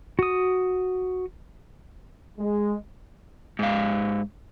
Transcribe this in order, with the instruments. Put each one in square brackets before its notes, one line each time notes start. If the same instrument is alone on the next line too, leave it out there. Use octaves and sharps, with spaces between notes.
[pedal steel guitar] F#4 D#6
[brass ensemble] G#3
[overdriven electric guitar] G#2 F5